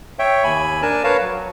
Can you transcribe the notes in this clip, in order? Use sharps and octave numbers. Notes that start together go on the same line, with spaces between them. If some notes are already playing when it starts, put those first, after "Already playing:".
C#5 E5 G5
D#2 G#5 B5
D4 A#4 G#5 A5
A#4 B4 C#5 F5 A5
F#3